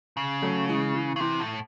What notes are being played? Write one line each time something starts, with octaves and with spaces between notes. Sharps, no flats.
C#3
F#3 A3
E3 G#3
E3
C#3
C3 E3
A2